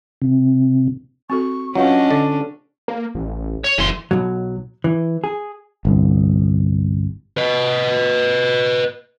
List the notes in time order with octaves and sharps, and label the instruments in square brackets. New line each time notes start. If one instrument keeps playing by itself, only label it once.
[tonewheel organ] C3
[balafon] C4 F#4 A4 [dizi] C#6
[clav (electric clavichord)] F#3 [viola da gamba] C#4 D4 [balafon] F4 B4 F5 [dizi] D#5
[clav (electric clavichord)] D3 D5
[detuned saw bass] A#3
A1
[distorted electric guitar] C#5
[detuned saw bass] F#1 [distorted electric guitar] E3 C6
[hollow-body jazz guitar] B1 B2 F#3
E3
G#4
[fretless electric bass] G1 C2
[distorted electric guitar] B4 D#5